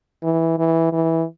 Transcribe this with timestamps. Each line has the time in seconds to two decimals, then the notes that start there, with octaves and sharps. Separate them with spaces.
0.23 E3
0.58 E3
0.93 E3